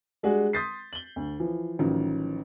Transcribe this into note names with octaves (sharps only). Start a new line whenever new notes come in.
G3 G#3 D4 F#4 G#4
C6 D#6 G6 A6 B6 C7
F#7 G7
D2
E3 F3
A1 D#3 F3 F#3